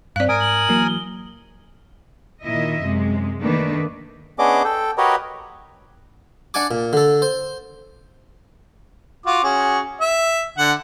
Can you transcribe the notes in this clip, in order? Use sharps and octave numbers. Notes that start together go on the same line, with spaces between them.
G2 C4 D5 F5 F#6
G#2 A#4 G#5 D#6 D7
F#7
E3 F#3 A#3
G7
A#2 D#3 E4 D#5 E5
F#2 C3 G#3
D#3 A3 A#3 D4 B4
B3 C#4 D4 G#4 D#5 D6
A4 G5
F#4 G4 A#4 B4 C#5 D#5
D4 D5 F#5 G#5 D6
A#2
D3 A4
C5
F4 F#4 D6
C#4 F#4 G#4
E5
D3 F#5